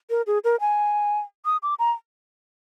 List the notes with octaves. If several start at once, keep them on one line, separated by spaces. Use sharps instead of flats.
A#4
G#4
A#4
G#5
D#6
D6
A#5